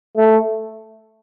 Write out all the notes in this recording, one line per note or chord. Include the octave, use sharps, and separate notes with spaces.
A3